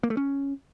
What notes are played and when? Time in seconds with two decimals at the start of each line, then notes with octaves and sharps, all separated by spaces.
0.03 A#3
0.10 A3
0.17 C#4